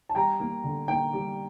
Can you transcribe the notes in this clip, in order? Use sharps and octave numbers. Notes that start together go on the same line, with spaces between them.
A5
G3 G5 A#5
A#3
D3
A#3 G5
G3